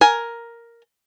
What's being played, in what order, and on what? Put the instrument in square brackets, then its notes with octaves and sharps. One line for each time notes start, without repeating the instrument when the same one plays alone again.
[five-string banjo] A#4 G#5